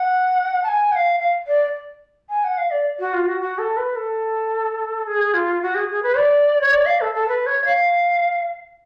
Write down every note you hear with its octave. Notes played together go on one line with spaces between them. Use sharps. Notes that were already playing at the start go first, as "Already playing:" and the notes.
Already playing: F#5
A5
G#5
F#5
F5
F5
D5
G#5
F#5
F5
D5
F#4
F4
F#4
F#4
A4
B4
A4
G#4
F4
F#4
G#4
G#4
B4
D5
C#5
D5
F5
A4
A4
B4
C#5
F5